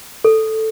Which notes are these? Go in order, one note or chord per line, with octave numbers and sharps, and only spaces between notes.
A4